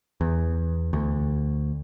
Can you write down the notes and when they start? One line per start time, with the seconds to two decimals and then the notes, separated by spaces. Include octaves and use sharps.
0.21 E2
0.93 D2